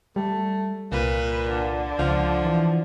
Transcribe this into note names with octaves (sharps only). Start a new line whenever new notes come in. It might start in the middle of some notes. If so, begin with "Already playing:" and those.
G3 A3
C2 A#2 B4
D3
C#2 F3
E3